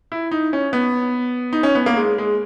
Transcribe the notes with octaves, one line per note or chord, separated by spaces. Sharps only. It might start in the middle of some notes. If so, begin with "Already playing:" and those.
E4
D#4
C#4
B3
D#4
C#4
B3
A#3
G#3
G#3